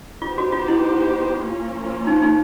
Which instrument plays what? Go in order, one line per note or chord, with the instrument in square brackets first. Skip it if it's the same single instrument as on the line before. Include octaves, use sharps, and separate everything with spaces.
[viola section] B3 D#4 G4 C5 [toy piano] F4
[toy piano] F#4
F4
E4
[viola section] F3 A#3 C#4 F4
[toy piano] D#4
D#4